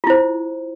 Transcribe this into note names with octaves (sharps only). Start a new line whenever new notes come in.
E4 F4 C5